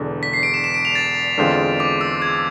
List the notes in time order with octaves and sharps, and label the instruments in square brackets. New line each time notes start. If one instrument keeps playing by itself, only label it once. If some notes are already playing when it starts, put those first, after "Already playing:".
Already playing: [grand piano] E1 E2 D3
[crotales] B6
C7
D7
E7
E7
D7
F7
A6
[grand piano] E2 D3 G#3 C4 F4
[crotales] D6
E6
G#6